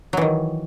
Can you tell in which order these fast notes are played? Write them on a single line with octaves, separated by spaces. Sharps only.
F#3 E3 D#3